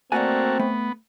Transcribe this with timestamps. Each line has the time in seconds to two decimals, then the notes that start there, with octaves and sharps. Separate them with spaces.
0.12 A3 A#3 C4 F#4 D5 F#5 G#5
0.59 A3 B3